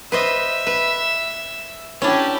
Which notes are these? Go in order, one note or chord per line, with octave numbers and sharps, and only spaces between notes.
B4 C5 D#5 E5
B4
C#4 D4 E4 G4